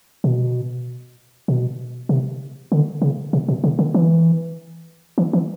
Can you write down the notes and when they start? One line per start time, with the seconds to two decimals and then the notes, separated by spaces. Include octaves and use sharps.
0.24 B2
1.48 B2
2.09 C3
2.72 D3
3.02 C#3
3.33 C3
3.48 B2
3.64 C#3
3.79 D3
3.94 E3
5.18 E3
5.33 E3